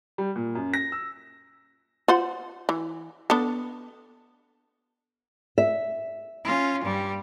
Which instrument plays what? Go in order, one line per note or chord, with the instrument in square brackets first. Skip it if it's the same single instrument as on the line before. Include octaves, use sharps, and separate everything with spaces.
[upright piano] G3
A#2
F#2
A#6
E6
[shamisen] F4 C5 F#5
E3
B3 D4 A4
[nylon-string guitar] E5
[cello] C#4 F4
G2 G3